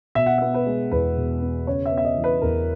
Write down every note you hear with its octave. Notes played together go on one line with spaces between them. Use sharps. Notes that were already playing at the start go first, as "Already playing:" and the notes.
B2 E5
F#5
B3 E5
B4
G#3
E2 B4
B2
B3
C#3 C#5
E5
B3
E5
D#5
E3
B4
E2 A#4